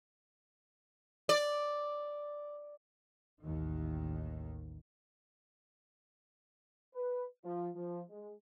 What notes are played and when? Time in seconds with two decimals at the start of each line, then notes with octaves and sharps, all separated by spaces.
1.29 D5
3.43 A1 D#2 D#3
6.94 B4
7.44 F3
7.74 F3
8.09 G#3